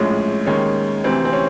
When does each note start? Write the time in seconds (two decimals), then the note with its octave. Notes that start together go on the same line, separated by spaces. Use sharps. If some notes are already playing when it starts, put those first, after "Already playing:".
Already playing: A#1 A2 F3 G#3 C#4
0.46 D#2 D#3 G#3 C#4
1.04 D2 C3 E3 C4
1.25 C4
1.33 C#4